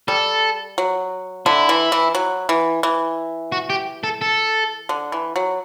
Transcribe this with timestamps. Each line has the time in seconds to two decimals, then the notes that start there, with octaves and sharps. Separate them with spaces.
0.08 G3 A4
0.78 F#3
1.46 D3 E4
1.69 E3
1.92 E3
2.15 F#3
2.49 E3
2.83 E3
3.52 F#4
3.70 G4
4.04 A4
4.21 A4
4.89 D3
5.12 E3
5.36 F#3